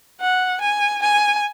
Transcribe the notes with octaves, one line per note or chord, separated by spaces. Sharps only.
F#5
G#5
G#5